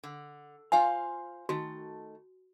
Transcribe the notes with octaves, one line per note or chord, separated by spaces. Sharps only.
D3
F4 C5 F5 G#5
D#3 A3 F#4